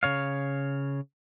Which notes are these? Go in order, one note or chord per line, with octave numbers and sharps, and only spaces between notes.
C#3 C#5 F5